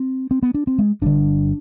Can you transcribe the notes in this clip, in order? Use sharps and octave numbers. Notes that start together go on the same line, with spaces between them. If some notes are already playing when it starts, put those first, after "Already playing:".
Already playing: C4
C4
B3
D4
C4
G#3
G1 G2 D3 D4